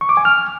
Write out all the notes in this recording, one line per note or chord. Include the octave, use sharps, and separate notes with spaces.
C#6
D6
G#5
F6